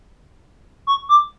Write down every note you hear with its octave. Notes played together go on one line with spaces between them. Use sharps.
C#6
D6